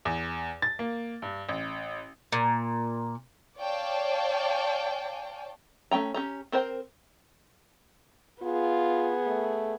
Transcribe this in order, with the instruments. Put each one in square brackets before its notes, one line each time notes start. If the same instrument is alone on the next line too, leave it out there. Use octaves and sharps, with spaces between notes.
[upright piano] E2
A6
A#3
G2
A1
[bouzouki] A#2
[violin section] C#5 D5 F5 G5 A5
[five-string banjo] A3 C#4 G5 A#5
C#4 G4 A#5
C4 A#4 C5 G5
[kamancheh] B3 G#4 [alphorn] F4
[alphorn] A3